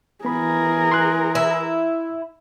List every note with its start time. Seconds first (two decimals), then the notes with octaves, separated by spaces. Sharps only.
0.25 E3 B3 G#4 A#4 B5
0.92 C6 F#6
1.35 E4